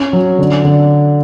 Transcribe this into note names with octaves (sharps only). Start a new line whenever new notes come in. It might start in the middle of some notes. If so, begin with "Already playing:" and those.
Already playing: C#4
F#3
D3
D3